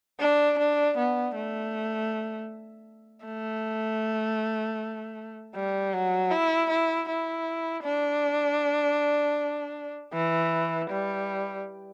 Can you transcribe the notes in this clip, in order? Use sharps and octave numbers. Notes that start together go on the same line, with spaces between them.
D4
D4
B3
A3
A3
G3
F#3
E4
E4
E4
D4
E3
G3